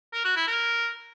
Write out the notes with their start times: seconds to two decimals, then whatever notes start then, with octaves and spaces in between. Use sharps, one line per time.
0.13 A#4
0.25 F#4
0.36 E4
0.48 A#4